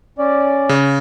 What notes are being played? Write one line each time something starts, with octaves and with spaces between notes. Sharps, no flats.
C#4 D5
C#3